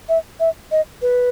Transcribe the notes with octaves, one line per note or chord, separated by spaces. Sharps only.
E5
E5
D#5
B4